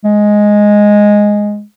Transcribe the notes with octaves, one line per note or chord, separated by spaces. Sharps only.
G#3